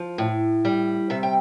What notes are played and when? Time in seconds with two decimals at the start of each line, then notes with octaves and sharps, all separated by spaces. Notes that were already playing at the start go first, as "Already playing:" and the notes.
Already playing: F3
0.18 A2
0.65 G3
1.10 C3 E5
1.23 G5